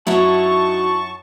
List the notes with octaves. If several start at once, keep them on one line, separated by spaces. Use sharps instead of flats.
F#2 F#3 D#4 E4 A5 C#6